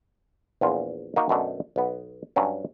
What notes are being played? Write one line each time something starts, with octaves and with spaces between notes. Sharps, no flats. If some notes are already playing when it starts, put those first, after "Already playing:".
A#1 E2 F4
A#3 D#4 F#4
F#2 B2 A3 D4
B1 B3
G2 F#3 C#4